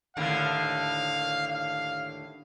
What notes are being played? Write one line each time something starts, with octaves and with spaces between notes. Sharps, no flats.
D#2 A2 D3 F5
F5